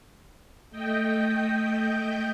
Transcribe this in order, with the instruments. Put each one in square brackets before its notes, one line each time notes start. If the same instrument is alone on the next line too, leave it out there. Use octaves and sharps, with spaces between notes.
[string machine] A3 D#5 G5 G6